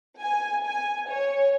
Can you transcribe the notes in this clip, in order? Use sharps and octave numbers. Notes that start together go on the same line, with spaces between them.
G#5
G#5
C#5